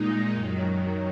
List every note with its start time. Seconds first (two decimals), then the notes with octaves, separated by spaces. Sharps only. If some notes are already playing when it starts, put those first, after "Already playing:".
Already playing: A#2 G#3 D#4
0.32 F#2 D#3 F#3